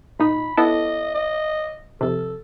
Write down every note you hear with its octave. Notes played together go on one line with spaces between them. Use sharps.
A#2 D#4 B5
B3 E4 A4 D#5
D#5
F2 C3 A4